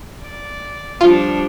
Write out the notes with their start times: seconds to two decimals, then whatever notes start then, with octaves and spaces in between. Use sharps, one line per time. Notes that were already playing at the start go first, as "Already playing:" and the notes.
0.21 D5
1.01 F3 G3 D4 F4